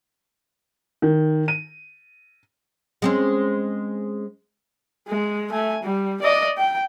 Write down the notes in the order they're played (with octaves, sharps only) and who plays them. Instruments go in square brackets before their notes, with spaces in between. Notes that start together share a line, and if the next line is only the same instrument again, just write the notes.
[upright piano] D#3
D#7
[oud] G#3 C4 C#4
[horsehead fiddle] G#3
A3 G#5
G3
D5 D#5
G5